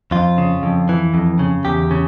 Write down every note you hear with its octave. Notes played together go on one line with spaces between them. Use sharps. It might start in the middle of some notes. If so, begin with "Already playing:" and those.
F2 F4
C#3
F2
E3
F2
C#3
E2 G4
C#3